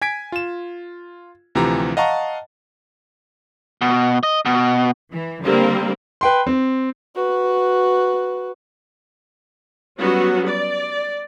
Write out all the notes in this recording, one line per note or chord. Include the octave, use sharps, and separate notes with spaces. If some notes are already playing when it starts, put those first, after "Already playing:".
G#5 G#6 B6 D7
F4 E7
D2 C3 E3 F3 G4 A#5
D#5 F5 F#5 A5 A#5 C#6
B2
D#5
B2
E3
D3 G3 A#3 C4
B4 G5 C6
C4
F#4 B4
F#3 G3 B3 C#4 F#4
D5